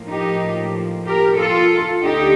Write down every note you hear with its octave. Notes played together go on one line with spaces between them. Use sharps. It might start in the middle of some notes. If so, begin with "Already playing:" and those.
Already playing: A2 F3 A#3
D#4 G4
G4 A#4
F4 A4
D2 D3 A3 D#4 G4